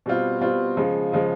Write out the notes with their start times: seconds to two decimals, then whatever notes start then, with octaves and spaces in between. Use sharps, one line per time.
0.06 B2 G3 C4 F4
0.41 B2 G3 C4 F4
0.77 C#3 F3 G#3
1.12 C#3 F3 G#3